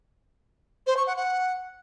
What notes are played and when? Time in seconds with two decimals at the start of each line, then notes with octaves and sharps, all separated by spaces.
0.87 C5
0.97 C#6
1.07 F#5
1.17 F#5